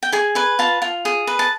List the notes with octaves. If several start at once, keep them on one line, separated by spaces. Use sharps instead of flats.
G5
G#4 G#5
B4 G#5
F4 A5
F4
G#4
B4
A5